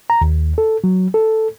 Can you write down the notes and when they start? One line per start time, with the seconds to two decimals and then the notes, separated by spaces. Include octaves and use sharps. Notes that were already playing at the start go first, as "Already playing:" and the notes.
0.10 A#5
0.21 D#2
0.58 A4
0.84 F#3
1.14 A4